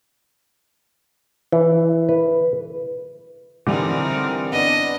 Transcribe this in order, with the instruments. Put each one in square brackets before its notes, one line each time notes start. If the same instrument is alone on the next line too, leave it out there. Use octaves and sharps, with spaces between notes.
[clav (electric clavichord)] E3
B4
[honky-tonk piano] D3 E3 G3 [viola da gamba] C4 D#4 A#4
[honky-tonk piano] B3 D4 [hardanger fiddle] D#5